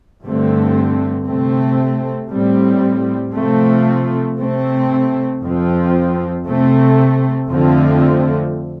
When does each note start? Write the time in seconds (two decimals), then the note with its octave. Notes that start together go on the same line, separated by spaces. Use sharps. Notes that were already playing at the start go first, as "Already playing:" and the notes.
0.23 G2 D3 A3 C4
1.26 C3 A3 C4
2.30 A2 G3 C4
3.34 C3 F3 A3 C4
4.38 C3 A3 C4
5.41 F2 F3 C4
6.45 C3 A3 C4
7.48 F2 D3 F3 A3 C4